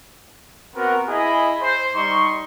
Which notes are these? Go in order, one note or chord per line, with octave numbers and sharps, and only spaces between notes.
B3 C4 F#4 A#4
E4 G#4 D#5 G#5 B5
C5
G3 D#4 C6 C#6